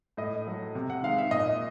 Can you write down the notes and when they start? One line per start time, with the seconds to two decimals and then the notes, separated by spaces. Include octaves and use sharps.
0.17 A2 D#5
0.47 F#3 A3
0.75 C3
0.90 F#5
1.02 D#3 G#3 F5
1.18 E5
1.31 A#2 D#5